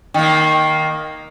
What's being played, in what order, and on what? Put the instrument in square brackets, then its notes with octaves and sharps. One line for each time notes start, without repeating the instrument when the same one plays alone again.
[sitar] D#3 A#3